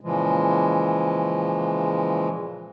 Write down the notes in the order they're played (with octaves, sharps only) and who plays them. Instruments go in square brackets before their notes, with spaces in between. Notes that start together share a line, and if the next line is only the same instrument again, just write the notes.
[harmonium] A#2 C#3 E3 F3 G#3